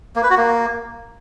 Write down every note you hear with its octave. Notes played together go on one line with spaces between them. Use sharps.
A#3
B4
F#4
A#3